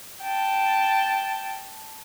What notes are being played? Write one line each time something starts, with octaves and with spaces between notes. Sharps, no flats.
G5 A5